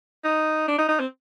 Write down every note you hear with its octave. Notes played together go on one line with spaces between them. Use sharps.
D#4
D4
D#4
D#4
C4